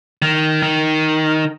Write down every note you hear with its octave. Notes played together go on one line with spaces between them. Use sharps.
D#3
D#3